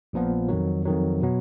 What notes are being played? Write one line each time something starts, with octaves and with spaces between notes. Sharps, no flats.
A#1 A#2 F3 B3
F2 D#3 F#3
F2 D#3 F#3
B2 F#3 B3